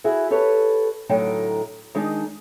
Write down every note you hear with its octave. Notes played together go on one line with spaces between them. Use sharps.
E4 F#4 G#4
G4 A4 B4 C#5
A2 D3 F#3 D#4 F#5 G5
D#3 G#3 D4 D#4